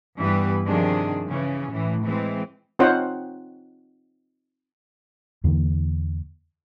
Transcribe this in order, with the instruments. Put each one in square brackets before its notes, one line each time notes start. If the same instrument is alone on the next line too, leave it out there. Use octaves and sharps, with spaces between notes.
[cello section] G2 E3 G3 B3 G4 B4
C3 D#3 F3 D4 G#4
C#3 E3 C#4
A2 E3
E3 G#3 C4
[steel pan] C4 D#4 F4 C5 C#5 F#5
[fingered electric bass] E2 D3 E3 A#3